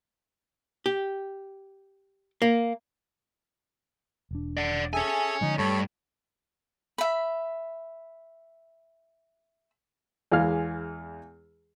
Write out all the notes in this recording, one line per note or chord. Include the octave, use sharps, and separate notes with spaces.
G4
A#3
E1 D4
D5 F#5
G#4 A4 C#5 E5 G#5
D3 F3 G#3 D#4
G2 A3 A4 C#5 B5
E5 B5
E2 E3 G#3 F5 F6